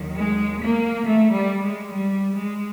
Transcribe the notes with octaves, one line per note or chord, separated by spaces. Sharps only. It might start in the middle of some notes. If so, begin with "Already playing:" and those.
Already playing: D#2 D#3 F#3
G#3
A#3
A3
G3
G#3
G3
G#3